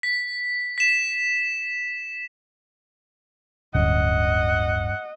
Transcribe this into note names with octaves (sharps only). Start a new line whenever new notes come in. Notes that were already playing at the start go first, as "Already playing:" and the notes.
B6
B6 E7
D1 G2 C#4 D#5 F#5